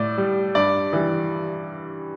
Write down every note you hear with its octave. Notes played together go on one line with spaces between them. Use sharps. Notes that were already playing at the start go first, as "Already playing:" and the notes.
Already playing: A2 D5
G3
G2 D5
E3 G3